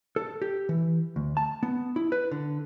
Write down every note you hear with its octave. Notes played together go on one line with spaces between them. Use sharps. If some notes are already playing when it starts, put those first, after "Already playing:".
A4
G4
E3
D2
A5
B3
E4
B4
D3